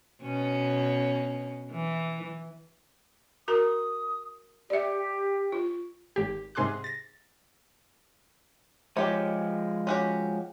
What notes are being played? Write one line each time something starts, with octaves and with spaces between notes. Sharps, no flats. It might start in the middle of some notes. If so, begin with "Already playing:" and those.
B2 C#4
E3
F#4 A#4 A#5 D#6
G4 D5 E5
F4
G#1 G4
G#2 C3 G#4 C6 D6 F#6
A6 A#6
F3 G#3 G4 C#5
C#4 F#4 G4